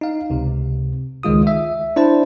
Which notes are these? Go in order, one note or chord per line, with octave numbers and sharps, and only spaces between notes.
D#4 F5
C#2 C3
C#2 D#3 G#3 F4 D#6
E5
D4 E4 C5 A5